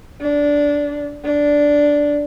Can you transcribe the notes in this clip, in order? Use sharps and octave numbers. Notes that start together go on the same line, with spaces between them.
D4
D4